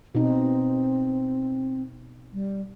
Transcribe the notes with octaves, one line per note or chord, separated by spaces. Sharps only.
B2 C4 D#4
G3